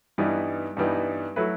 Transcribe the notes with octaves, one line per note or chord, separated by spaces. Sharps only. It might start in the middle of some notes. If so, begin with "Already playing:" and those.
G2 E3 G3 B3 D#4
G2 E3 G3 B3 D#4
F#3 A3 E4 B4